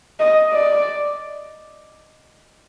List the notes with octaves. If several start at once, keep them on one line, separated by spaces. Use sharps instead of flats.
D#5
D5